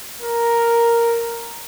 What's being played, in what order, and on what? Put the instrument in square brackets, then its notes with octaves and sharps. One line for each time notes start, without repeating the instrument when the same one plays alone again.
[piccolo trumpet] A#4